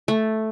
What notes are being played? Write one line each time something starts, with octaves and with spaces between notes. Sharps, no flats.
A3